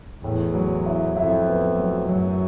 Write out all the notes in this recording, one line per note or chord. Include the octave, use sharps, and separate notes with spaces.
E2 A2
F#3
E4
F2 E4
B3
F#3
F#2 F#3